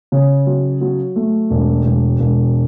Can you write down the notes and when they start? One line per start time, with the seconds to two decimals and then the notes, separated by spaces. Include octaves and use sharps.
0.12 C#3
0.46 F#3
0.81 F#3
1.16 A3
1.50 E1
1.85 E1
2.20 E1